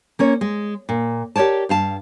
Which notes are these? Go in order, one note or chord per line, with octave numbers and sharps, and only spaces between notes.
A#3 C#4 C#5
G#3
A#2
G4 A#4 C#5 D5 A5
G2 F5 A5